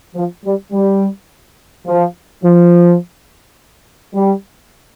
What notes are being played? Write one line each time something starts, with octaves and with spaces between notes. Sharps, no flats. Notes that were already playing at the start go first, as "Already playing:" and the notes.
F3
G3
G3
F3
F3
G3